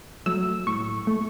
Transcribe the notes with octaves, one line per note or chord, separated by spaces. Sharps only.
F#3 A3 E6
A2 C#6
A3